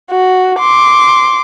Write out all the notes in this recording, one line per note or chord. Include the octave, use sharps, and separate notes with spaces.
F#4
C6 D6